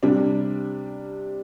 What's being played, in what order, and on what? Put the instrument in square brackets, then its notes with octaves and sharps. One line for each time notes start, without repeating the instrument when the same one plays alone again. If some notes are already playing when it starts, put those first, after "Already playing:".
[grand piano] C3 G3 D4